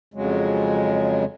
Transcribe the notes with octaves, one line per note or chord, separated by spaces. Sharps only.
F2 C#3 F#3 G#3